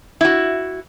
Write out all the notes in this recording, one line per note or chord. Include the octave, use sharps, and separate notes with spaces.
E4 F#4